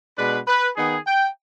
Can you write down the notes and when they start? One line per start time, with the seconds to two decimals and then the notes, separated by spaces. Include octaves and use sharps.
0.18 B2 G#3 D4 B4
0.47 B4
0.77 D#3 B3 D#4 G#4
1.06 G5